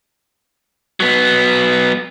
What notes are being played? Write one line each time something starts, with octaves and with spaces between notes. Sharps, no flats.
F#3 B3